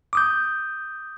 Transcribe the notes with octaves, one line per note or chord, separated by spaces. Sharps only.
D6 D#6 G6